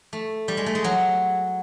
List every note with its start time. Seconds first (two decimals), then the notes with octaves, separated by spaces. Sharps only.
0.13 A3
0.48 G3
0.57 G#3
0.66 A3
0.75 G#3
0.84 F#3